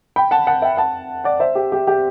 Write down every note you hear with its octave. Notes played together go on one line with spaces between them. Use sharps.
G5 B5
F#5 A5
F#5 A5
E5 G5
F#5 A5
D5 F#5
C5 E5
G4
G4
G4